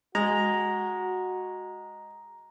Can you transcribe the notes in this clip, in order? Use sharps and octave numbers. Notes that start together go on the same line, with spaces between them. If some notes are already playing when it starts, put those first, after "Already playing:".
G#3 F#4 A#5